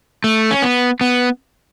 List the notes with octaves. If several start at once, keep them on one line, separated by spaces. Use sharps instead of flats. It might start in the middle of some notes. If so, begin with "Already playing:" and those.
A3
C#4
B3
B3